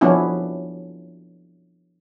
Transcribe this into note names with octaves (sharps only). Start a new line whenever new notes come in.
F3 F#3 B3 C#4 D4 E4